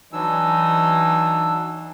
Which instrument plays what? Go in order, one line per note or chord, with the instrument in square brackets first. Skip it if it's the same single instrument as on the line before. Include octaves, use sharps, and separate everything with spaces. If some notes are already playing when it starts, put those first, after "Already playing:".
[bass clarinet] E3 [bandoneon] F#3 D4 E6 [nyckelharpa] D#4